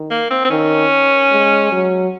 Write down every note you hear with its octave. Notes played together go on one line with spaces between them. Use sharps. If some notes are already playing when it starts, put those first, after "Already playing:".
Already playing: D#3
A#3
C4
C4
D#3 C#4
G#3
F#3